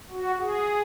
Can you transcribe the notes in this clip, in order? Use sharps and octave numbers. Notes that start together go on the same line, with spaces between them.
F#4
G#4